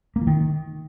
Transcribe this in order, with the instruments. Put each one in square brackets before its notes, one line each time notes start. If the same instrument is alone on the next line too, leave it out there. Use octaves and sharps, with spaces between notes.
[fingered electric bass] A#3
E3
D#3